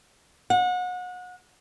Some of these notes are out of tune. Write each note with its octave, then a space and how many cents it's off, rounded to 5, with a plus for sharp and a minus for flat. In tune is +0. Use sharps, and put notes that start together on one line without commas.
F#5 -30